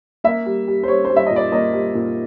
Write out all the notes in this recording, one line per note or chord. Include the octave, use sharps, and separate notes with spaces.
A#3 E5
G3
G3
C5
G3 C#5
C5
G3
E5
A#2 D#5
D5
A#3 D#5
G3
A#2